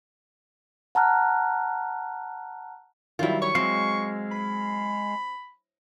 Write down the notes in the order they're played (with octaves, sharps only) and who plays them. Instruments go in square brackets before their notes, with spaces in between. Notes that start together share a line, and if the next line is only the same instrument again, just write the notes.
[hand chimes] F#5 A5 A#5 F6 F#6
[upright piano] D#3 F#3 G3 [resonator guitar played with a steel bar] E4 F4
[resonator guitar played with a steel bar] C#5 [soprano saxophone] C#6
[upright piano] F#3 [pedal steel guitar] G#3 F5 [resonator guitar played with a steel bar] C4
[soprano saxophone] B5